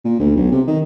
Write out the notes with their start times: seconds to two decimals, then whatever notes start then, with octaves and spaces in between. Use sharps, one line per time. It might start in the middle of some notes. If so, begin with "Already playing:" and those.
0.05 A#2
0.20 D2
0.35 B1
0.52 C3
0.68 D#3